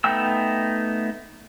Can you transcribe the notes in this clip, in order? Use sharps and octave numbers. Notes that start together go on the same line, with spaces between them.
A3 B3 D#4 G5 E6